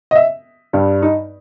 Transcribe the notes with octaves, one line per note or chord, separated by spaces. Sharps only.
D#5
E5
G2 G3
D#4